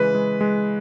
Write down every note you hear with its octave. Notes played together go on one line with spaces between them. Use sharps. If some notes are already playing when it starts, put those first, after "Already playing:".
Already playing: C#3 E3 G#3 B4
G#3
G#3